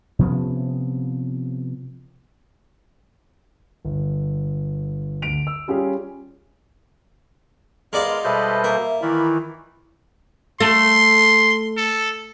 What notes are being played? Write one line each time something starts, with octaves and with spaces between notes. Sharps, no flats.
C3 F3 B3 C#4
G1
D2 D7 F7
E6
G3 C#4 F4 G4 G#4
G#3 B3 F4 A#4 D5 D#5 F5 A#5
B2 G3 A4 B4 C5 D#5 E5
A#3
D#3 E3 E4 A#4 D5 B5
A3 C6
A4